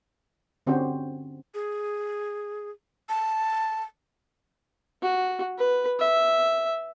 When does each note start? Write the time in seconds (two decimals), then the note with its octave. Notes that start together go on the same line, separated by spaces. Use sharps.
0.67 D3 C4 C#4 F#4 G4 C5
1.54 G#4
3.09 A5
5.02 F#4
5.58 B4
6.00 E5